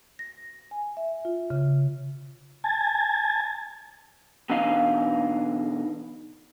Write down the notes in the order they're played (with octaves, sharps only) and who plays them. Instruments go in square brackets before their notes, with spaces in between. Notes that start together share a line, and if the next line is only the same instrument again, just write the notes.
[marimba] A#6
G#5
E5
F4
C#3
[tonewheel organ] G#5 A5
[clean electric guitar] B2 D3 E3 D#4 F5